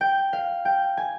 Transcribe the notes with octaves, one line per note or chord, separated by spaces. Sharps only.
G5
F5
G5
G#5